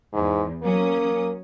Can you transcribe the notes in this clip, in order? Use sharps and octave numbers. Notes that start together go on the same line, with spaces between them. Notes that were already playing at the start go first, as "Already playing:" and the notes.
E2 G#2
F#3 A#3 C#4 D#6